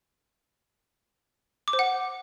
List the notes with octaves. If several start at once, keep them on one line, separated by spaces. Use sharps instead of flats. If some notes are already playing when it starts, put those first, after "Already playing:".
D6
C5
F#5